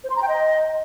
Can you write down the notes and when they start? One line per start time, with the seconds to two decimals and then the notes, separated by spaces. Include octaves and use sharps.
0.04 C5
0.10 C6
0.16 A#5
0.22 G5
0.28 D#5